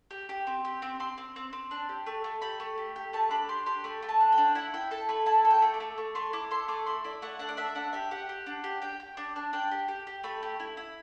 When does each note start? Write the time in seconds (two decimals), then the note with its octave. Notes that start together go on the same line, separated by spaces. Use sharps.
0.11 G4
0.29 G4
0.47 C4
0.65 G4
0.82 C4
1.00 C4 C6
1.18 C4
1.36 C4
1.53 C4
1.71 D4
1.89 G4
2.06 A3
2.24 A3
2.42 G4 B5
2.60 A3
2.78 G4
2.96 G4
3.13 A3 A5
3.30 D4 B5
3.49 G4 C6
3.66 G4 C6
3.84 A3 B5
4.02 A3
4.09 A5
4.20 D4
4.32 G5
4.38 D4
4.55 E4 F#5
4.74 E4 G5
4.91 A4 A5
5.09 A3 B5
5.26 E4 A5
5.45 A4
5.50 G5
5.62 A3
5.74 D6
5.80 A3
5.98 A3
6.15 A3 C6
6.33 E4 D6
6.51 A4 C6
6.68 A3 D6
6.86 E4 C6
7.04 E4 D5
7.22 A3 F#5
7.39 D4 F#5
7.49 D5
7.57 D4 E5
7.75 D4 F#5
7.93 G4 E5
8.11 G4 F#5
8.29 G4
8.46 D4
8.64 G4
8.82 G4 G5
9.00 G4
9.17 D4
9.36 D4
9.53 D4 G5
9.71 G4
9.88 G4
10.07 G4
10.24 A3 B5
10.43 G4
10.60 E4
10.77 E4